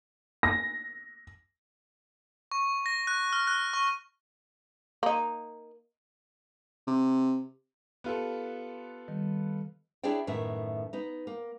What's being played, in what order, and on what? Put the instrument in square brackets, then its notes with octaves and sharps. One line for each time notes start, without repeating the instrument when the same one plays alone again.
[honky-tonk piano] A#6
[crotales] C#6
A#6
F#6
F6
F#6
C#6
[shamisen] A#3 D#4
[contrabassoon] C3
[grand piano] B3 F4 A4 [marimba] G4
[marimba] D#3 G3
[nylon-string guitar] D4 E4 G#4 C#5 D5 G5
F#2 A2 D#3 B3 E5
B3 D#4
A#3